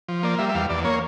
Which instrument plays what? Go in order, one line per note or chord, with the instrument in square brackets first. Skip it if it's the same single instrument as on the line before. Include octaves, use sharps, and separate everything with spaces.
[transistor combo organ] F3
A#3 D5
G3 E5
E5
E2 F5
E2 D5
A#3 C#5